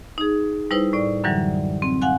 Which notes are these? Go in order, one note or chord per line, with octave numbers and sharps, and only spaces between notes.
D#4 G#4
G3 D#4 E4 B4 C5
A2 D5
F#2 D3 E3 F#3 G3
C4
F5 F#5 G#5 F#6